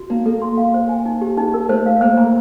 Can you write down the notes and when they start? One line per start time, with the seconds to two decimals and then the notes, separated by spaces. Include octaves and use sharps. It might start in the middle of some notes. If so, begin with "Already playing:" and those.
Already playing: F#4
0.10 A#3 D#4
0.26 A#3 A4
0.42 C6
0.58 F5
0.74 C5
0.89 G#5
1.06 D#4
1.21 G4
1.37 D#4
1.54 A#4
1.69 A3 C5
1.86 F5
2.01 A#3 C5
2.18 A#5